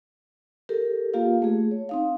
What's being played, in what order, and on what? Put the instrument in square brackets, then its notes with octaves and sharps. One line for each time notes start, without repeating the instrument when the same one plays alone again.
[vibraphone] G4 A4 A#4
A#3 F4 G4 F5
A3 G#4
C#5
C4 D#4 F5